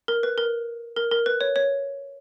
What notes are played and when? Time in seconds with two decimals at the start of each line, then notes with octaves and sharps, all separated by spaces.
0.08 A#4
0.23 B4
0.38 A#4
0.96 A#4
1.11 A#4
1.26 B4
1.41 C#5
1.56 C#5